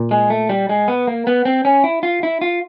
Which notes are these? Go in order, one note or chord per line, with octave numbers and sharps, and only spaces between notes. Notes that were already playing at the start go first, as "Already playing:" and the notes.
Already playing: A#2
G#3
A3
G3
G#3
B3
A#3
B3
C4
C#4
E4
F4
E4
F4